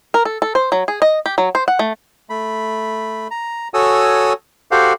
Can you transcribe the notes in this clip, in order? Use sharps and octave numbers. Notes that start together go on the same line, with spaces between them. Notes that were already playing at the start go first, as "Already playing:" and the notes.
A#4
A4
A4
C5
F#3
G#4
D#5
G4
F#3
C5
F#5
A3
A3 B5
A#5
F#4 A4 C#5 G#5 D#6 E6
F#4 G4 A4 C5 F5 F#5